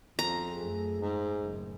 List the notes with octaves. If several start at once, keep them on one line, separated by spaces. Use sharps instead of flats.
F2 A#5
F#2 A3 G#4
G#2
F#1 A2